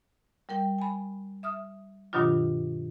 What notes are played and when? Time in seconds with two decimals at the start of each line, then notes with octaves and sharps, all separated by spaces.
0.49 G3 A#4 G5
0.78 G#5 B5
1.43 E5 D#6 F6
2.13 G2 B2 D#3 F#3 D4 F4